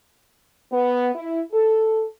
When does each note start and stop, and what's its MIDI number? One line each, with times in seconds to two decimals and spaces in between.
0.72 1.10 59
1.14 1.41 64
1.53 2.05 69